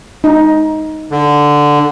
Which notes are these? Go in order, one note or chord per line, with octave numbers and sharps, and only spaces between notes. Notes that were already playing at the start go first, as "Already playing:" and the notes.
D#4
D3